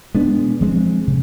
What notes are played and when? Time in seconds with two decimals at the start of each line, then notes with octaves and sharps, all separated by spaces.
0.14 B2 G#3 B3 D4
0.61 F3 G#3 C4
1.07 C3